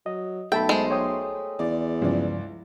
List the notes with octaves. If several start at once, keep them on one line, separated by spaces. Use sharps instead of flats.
F#3 D#5
B1 A3 E5 G5 A5 B5
G#3 C5
C#5 G5 D#6
E2 D5
C#2 G2 C#3 F3 D5